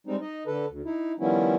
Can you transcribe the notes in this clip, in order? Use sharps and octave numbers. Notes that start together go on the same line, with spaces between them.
G3 G#3 C4 D#4
D#4 D#5
D3 A4 B4
D2
D#4 E4
D#3 F3 G3 B3 C#4 E4